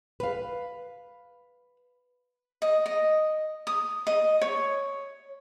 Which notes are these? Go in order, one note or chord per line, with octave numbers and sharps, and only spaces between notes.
B4 F5
D#5
D#5
D#6
D#5
C#5